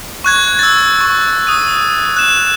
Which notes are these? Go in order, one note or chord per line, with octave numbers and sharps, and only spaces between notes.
C#6 F#6 G#6
E6 A6
C#6
D#6 D#7
F#6 E7